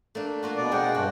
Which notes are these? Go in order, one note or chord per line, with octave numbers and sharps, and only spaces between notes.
A3 A#3 D4
A#3 F4 F#4
B2 D5
G#3 C4 G#4 F#5 G5
G2 D4 F#4